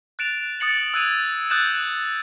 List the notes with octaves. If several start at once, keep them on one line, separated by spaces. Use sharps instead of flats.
F#6 A6 D7 E7 F7
D#6 A6 C#7 F#7
E6 F#6 G#6 D#7 F7
D#6 F#6 G6 A6 E7 F#7